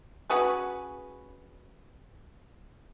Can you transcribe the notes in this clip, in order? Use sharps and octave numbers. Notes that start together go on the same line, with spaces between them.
C#4 F#4 G#4 B4